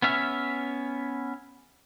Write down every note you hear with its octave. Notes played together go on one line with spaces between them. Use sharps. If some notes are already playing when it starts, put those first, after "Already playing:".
B3 C#4 E5 F6